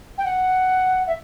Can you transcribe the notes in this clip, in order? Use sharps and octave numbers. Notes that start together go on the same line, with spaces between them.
G5
F#5
E5